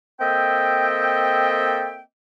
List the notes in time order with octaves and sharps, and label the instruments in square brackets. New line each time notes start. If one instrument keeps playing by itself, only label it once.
[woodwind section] A#3 C4 A4 D#5 E5 G5